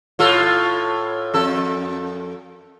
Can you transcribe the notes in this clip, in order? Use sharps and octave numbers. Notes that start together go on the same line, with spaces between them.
A2 F4 A4
F2 A4